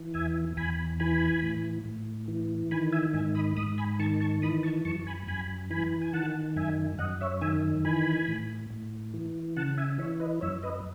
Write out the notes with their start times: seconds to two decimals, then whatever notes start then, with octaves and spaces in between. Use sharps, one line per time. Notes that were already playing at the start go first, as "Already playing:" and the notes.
Already playing: E3
0.14 E2 E5 G#5
0.57 E2 G#5 B5
1.00 E3 G#5 B5
1.42 A2
1.85 A2
2.28 E3
2.71 D#3 G#5 B5
2.92 E5 G#5
3.14 G#2 E5 G#5
3.35 B5 D#6
3.57 G#2 B5 D#6
3.78 G#5 B5
3.99 D#3 A5 C#6
4.20 A5 C#6
4.42 E3 B5 D#6
4.63 A5 C#6
4.85 F#2 A5 C#6
5.07 G#5 B5
5.27 F#2 G#5 B5
5.70 E3 G#5 B5
6.02 G#5
6.13 D#3 F#5 A5
6.56 F#2 E5 G#5
6.99 F#2 D#5 F#5
7.21 C#5 E5
7.41 D#3 E5 G#5
7.85 E3 G#5 B5
8.28 A2
8.70 A2
9.14 E3
9.56 C#3 F#5 A5
9.78 E5 G#5
9.98 E3 C#5 E5
10.20 B4 D#5
10.41 F#2 C#5 E5
10.63 B4 D#5